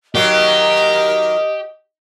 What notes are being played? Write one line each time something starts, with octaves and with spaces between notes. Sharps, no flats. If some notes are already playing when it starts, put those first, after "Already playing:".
D#3 F#3 F4 G4 A#4 D#5